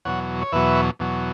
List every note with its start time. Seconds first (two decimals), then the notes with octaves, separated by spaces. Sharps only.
0.05 E2 B2 F#3 C#5 F#5
0.42 C#5
0.52 E2 B2 F#3 B4 E5
0.99 E2 B2 F#3